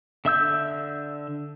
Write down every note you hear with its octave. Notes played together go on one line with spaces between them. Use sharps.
D3 E5 E6 G6